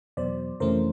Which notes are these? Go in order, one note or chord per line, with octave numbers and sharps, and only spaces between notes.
E2 B2 F#3 C5 D5
F2 C3 E3 A3 C#4 A#4 C5